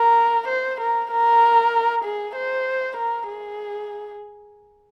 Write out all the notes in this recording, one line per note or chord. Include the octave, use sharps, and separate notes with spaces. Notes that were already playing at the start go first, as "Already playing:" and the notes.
Already playing: A#4
C5
A#4
A#4
G#4
C5
A#4
G#4